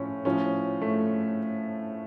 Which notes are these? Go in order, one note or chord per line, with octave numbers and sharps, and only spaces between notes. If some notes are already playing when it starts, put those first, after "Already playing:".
Already playing: A2 F3 C#4
A2 F3 C#4
A3